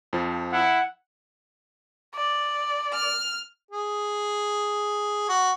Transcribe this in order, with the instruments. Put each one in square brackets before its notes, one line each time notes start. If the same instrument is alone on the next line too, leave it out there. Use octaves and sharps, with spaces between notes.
[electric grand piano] F2 F3
[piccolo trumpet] E4 [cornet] F#5
[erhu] D5
[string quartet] F6
[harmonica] G#4
F#4